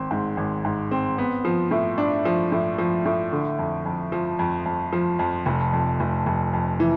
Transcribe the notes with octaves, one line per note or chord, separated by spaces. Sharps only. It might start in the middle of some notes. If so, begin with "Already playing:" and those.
Already playing: G#1 C4
G#2
G#1
G#2
C4
B3
F3
A2
D4
F3
A2
F3
A2
D3
F2
F2
F3
F2
F2
F3
F2
F1
F2
F1
F1
F2
E3